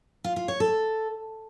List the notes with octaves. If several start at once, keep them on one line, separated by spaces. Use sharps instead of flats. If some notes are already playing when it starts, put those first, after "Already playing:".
F4
F4
C#5
A4